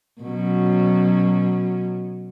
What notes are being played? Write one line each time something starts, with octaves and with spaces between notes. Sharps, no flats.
B2 F#3 C#4